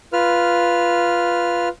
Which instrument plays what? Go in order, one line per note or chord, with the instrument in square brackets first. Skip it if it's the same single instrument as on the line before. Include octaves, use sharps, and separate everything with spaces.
[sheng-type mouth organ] F4 B4 F6